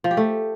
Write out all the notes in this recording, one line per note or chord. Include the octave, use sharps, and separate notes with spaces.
F3
G4
A3